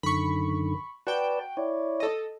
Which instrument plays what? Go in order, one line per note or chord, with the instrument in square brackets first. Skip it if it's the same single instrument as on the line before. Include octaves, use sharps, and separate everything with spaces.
[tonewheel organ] F#2 D3 D#3 [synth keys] B5 C#6
[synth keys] F#4 G5 [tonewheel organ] B4 D5 A5
[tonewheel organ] E4 C#5 D5
[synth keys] A4 D#5